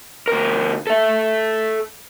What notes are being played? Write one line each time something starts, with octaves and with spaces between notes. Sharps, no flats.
D2 A#4
A4 E5